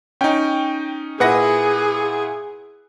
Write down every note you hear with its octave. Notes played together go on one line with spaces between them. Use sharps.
C#4 D#4 G5
A#2 E4 G#4 B4 F#5 A#6